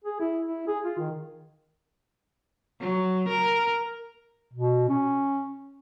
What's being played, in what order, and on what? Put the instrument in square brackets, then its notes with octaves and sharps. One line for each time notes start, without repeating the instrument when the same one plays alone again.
[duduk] G#4
E4
E4
G#4
F4
D#3
[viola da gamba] F#3
A#4
[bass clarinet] B2
C#4